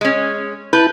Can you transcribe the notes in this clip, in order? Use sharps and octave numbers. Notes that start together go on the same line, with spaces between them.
G#3 C#4
E4 B4 A5 G6